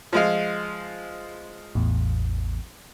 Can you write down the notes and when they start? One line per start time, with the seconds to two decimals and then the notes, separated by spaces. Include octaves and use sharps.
0.13 F3 G#3 F4
1.75 A1 E2